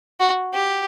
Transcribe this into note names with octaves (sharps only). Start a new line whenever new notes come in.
F#4
G4